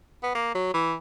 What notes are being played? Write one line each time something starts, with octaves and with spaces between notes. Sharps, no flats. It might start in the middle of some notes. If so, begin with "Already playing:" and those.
B3
A#3
F#3
E3